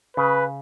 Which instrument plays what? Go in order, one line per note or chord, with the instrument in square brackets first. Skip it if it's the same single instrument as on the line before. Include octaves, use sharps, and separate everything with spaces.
[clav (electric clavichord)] C#3 [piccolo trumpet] B4